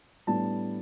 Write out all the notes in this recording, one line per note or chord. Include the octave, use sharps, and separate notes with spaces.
A2 G3 B3 D4 A5